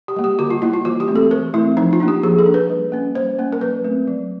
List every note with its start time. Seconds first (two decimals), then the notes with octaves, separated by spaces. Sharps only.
0.08 G4
0.16 G3 A#3
0.24 G4
0.39 D3 F#4
0.50 F4
0.62 G3 A#3 E4
0.73 F4
0.85 E3 F#4
1.00 G4
1.08 A3 C4
1.16 A4
1.31 E3 A#4
1.54 A3 C4 E4
1.77 F3 D#4
1.93 F4
2.00 A#3 D4
2.08 G4
2.23 F3 G#4
2.39 A4
2.46 A#3 D4
2.54 B4
2.70 G3
2.92 A#3 C#4
3.15 G3 C5
3.39 A#3 C#4
3.52 A#4
3.61 F#3 B4
3.84 A3 C4
4.07 F#3